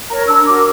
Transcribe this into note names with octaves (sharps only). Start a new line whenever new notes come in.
A#4 C#5 A#5
D4 E6
F#4 A#4 D6